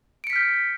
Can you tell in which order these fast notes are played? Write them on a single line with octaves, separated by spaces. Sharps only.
D7 C#7 B6 F6 G6